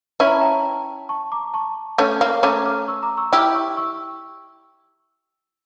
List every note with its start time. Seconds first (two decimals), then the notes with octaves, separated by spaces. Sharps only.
0.20 C#4 E4 C#6
0.27 A#5
0.34 A5
0.41 G5 A#5
1.09 A5 C#6
1.32 A#5 D6
1.54 A5 C#6
1.98 A3 C#4
2.21 A#3
2.43 A3 C#4 A#5 D6
2.66 D6 F6
2.88 C#6 E6
3.03 A#5 D6
3.17 C#6 E6
3.33 E4 G4 D6 F6
3.55 C#6 E6
3.77 C#6 E6